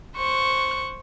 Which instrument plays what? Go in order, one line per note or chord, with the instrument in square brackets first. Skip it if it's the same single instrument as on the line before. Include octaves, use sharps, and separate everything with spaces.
[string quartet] C5 C#6 F#6